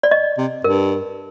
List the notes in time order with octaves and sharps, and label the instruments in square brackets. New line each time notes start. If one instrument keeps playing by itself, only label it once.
[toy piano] D5
D#5
[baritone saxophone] C3
[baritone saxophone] G2 [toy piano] A#4